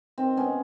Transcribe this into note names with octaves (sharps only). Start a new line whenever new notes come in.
D#3 C4
G#3 B3 C#4